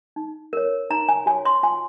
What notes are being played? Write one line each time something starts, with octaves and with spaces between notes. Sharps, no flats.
D#4
A#4 C#5
D#4 A#5
G#5
F#4 C#5 G#5
C6
F4 G#5